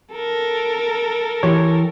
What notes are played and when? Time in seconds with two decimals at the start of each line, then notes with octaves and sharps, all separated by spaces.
0.14 A4 A#4
1.43 E3 G4 C#5